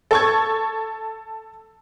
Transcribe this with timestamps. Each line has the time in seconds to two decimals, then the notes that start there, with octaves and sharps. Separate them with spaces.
0.11 A4 C#6 G#6